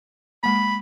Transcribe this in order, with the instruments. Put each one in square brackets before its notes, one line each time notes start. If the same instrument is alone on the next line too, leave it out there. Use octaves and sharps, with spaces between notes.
[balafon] G#3 A#3 [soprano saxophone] B5